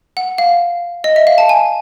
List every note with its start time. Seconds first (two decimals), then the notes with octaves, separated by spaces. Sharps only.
0.17 F#5
0.38 F5
1.04 D#5
1.16 E5
1.27 F5
1.38 A5
1.49 G#5